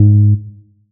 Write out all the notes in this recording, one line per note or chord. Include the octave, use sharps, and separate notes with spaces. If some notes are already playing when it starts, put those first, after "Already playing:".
Already playing: G#2